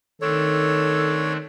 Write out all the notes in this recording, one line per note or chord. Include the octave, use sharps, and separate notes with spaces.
D#3 A3 C4 D4 A4 C#5